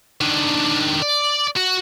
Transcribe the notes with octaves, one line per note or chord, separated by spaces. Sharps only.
D#3 D4
D5
F#4